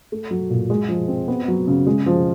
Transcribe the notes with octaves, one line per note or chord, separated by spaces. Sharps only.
A3
F#3
A#2
G#3
F3
C4
B3
F#3
C#3
G#3
F3